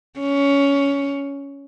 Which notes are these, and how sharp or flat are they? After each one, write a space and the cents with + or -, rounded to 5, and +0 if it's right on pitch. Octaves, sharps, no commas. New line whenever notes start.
C#4 +15